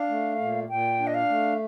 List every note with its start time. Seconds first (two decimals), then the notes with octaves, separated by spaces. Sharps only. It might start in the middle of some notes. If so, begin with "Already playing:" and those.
Already playing: D4 F5
0.09 A3
0.40 A#2
0.69 A#2 G5
0.99 D4
1.07 D#5
1.14 F5
1.29 A3